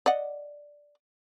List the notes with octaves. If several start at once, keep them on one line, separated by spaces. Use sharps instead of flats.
D5 D#5 F#5